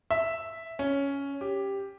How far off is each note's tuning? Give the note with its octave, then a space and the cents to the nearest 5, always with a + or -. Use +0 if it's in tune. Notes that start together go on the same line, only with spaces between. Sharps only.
E5 -5
C#4 +5
G4 +5